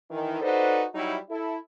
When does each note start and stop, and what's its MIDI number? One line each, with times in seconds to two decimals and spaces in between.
0.11 0.40 51
0.11 0.40 52
0.42 0.84 63
0.42 0.84 66
0.42 0.84 69
0.42 0.84 71
0.42 0.84 72
0.42 0.84 74
0.94 1.16 54
0.94 1.16 55
0.94 1.16 63
0.94 1.16 64
1.30 1.56 64
1.30 1.56 69